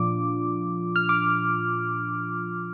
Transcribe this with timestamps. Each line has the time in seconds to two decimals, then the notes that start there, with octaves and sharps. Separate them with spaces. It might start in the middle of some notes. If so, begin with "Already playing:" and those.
Already playing: A#2 F3 D4 F4 D6
0.96 F6
1.09 D6